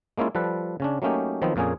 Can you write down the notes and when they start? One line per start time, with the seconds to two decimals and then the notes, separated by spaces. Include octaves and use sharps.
0.18 G#3 A#3 C#4 E4 F4
0.35 F3 G3 A4 B4
0.80 C#3 C#4 D4
1.02 F#3 A3 A#3 C#4 D#4 G4
1.42 D#3 F3 F#3 B3 C4
1.56 F2 A#2 A#3 C#4 G#4